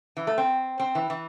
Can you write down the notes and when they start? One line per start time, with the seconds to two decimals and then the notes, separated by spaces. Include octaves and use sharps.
0.17 E3
0.27 A3
0.38 C4
0.79 C4
0.95 E3
1.10 E3